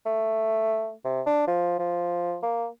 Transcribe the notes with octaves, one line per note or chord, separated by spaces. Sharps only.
A3
C3
D4
F3
F3
A#3